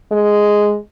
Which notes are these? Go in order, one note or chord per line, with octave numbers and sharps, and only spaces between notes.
G#3